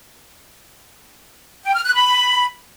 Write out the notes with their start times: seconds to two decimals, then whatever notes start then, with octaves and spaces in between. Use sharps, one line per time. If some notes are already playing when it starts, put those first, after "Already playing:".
1.64 G5
1.74 F6
1.84 F#6
1.95 B5